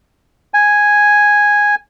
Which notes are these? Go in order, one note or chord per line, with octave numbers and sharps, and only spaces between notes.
G#5